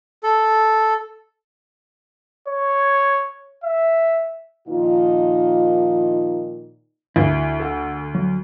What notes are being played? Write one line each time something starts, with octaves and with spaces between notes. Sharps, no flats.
A4
C#5
E5
A#2 D#3 F3 D#4 F4
D2 E4
A4 F#5
F#3